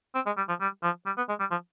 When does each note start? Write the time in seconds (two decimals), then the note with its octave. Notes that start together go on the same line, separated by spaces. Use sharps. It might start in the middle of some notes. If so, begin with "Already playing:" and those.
0.15 C4
0.26 G#3
0.38 G3
0.49 F3
0.61 G3
0.83 F3
1.06 G3
1.17 B3
1.29 G#3
1.40 G3
1.51 F3